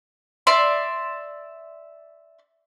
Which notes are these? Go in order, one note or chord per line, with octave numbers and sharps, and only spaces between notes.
D5 E5 C6